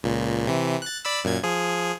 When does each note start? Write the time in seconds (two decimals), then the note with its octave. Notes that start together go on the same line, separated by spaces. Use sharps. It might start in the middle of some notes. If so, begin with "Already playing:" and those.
0.03 C#2 A#2
0.47 C3 E3
0.82 F#6 A6
1.05 D5 B5 E6
1.24 F#2 A#2 G#6
1.43 F3 G#4